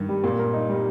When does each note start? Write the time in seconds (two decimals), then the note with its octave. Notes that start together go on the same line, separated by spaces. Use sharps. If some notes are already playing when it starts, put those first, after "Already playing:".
Already playing: G2 D#3
0.09 G3
0.24 A#2
0.39 A#4
0.53 D#4
0.69 G3